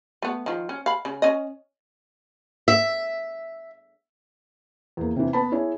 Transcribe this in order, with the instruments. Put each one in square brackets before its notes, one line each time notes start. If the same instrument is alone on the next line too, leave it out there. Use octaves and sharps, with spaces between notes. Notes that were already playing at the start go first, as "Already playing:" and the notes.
[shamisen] A3 B3
D#3 F3
C#4
F5 B5
C#3
C#4 D#5
[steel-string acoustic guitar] E5
[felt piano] E2 A#3
C3 E3
B3 A5 B5
E4 G#4 C#5